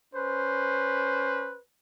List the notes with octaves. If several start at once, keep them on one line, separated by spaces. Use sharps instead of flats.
C#4 B4 C5